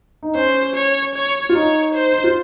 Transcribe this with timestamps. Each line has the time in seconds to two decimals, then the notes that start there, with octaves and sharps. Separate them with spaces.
0.23 D#4
0.35 C#4 C5
0.75 C#5
1.14 C#5
1.49 F4
1.55 D#4 C#5
1.94 C5
2.12 D#4
2.24 F4